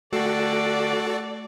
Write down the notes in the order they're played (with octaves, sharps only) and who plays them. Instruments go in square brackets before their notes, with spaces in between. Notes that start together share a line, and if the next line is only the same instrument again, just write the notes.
[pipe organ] D3 F5 G5 [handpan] A3 [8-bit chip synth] F#4 A4 [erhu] D5